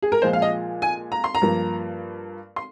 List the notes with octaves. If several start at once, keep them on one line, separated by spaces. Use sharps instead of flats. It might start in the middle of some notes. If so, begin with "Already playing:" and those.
G#4
A#4
A#2 F3 G#3 C5
F5
D#5
G#5
A#5
C6
A#5
G2 F3 A#3
C6